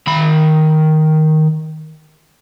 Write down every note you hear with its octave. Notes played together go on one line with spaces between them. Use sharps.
D#3 B5